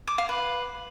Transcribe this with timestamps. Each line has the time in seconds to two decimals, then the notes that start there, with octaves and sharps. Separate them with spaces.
0.07 D6
0.18 F5
0.29 B4